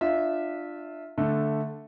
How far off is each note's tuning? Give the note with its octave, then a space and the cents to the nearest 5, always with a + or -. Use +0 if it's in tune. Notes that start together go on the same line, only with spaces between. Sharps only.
D4 +25 F4 +0 E5 -15
D3 +0 A3 +0